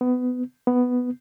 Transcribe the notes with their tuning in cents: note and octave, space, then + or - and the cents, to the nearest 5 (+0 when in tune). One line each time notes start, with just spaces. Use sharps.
B3 +20
B3 +5